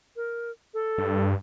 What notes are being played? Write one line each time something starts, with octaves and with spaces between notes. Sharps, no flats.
A#4
A4
G2